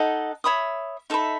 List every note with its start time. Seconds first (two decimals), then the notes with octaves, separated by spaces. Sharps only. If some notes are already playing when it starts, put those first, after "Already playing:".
Already playing: D#4 A4 D#5 F#5
0.44 C#5 E5 B5 D#6
1.10 D#4 A4 E5 B5